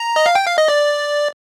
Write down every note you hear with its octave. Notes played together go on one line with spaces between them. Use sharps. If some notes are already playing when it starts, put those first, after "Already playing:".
Already playing: A#5
D#5
F5
G5
F5
D#5
D5